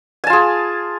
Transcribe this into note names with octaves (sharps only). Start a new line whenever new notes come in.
F4 G#4 G#5 A5